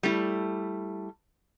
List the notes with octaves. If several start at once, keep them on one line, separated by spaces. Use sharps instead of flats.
G3 A3 E4